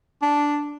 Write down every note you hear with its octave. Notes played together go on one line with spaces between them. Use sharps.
D4